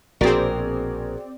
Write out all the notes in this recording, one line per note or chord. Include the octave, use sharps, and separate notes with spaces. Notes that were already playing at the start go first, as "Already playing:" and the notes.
A#1 B2 C4 F#4 G#4 A#4 D5